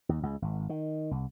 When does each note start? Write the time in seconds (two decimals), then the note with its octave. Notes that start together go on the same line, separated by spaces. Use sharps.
0.09 D#2
0.23 C#2
0.42 G#1
0.69 D#3
1.11 C2